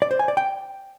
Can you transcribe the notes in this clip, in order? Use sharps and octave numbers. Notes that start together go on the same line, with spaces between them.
D5
C5
G#5
D5
G5